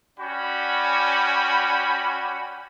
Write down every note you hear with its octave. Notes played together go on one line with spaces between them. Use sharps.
C#4 F#4 D5 G5 B5